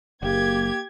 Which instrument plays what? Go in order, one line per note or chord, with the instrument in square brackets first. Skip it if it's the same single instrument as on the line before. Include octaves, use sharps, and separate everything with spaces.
[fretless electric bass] F#1 [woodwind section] A#3 [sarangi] G4 [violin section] G#6